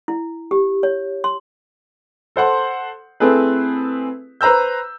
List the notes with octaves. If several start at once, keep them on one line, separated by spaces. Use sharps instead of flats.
E4
G4
C#5
C6
A4 C5 F#5 C6
A3 C4 E4 G#4 A4 B4
B4 C5 A#5 E6 G6